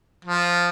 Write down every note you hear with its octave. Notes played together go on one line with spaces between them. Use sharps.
F3